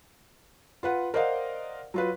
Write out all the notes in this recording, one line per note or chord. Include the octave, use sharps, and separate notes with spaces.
F4 B4 F#5
A#4 C5 D5 D#5 F5 F#5
F#3 F4 B4